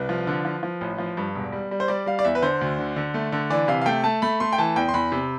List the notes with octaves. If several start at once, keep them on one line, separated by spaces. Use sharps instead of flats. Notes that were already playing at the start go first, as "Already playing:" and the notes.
Already playing: C2 B4
F3
D3
F3
F3
A1
F3
G2
E1
G3
G3
C5
G3 D5
G3 F5
D5
E2 E5
B4
D3 C5
D2
D3
D3
A3
D3
E3 D5
C3 F5
F5
A3 G5
A3 A5
A3 B5
A3 C6
G5
E3 A5
E2 G5
C6
E2 B5
C3